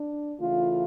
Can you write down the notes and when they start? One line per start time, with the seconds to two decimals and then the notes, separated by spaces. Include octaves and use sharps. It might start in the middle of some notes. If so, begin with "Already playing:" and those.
Already playing: D4
0.39 C#3 E3 A3 F4